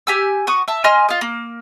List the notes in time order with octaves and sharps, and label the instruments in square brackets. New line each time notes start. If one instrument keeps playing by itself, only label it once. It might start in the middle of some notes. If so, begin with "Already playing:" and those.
[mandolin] G4 G#5 E6
F#4 C#6 D#6
E5 A5
D#5 G#5 C6 F6
F4 D#5
A#3